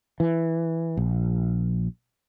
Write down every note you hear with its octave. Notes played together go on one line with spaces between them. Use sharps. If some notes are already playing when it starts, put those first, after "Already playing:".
E3
A#1